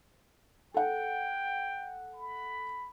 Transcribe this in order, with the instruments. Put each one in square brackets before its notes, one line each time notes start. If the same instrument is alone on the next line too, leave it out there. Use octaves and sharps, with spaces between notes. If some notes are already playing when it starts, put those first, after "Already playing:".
[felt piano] A4 F#5 [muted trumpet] G5
[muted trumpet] B5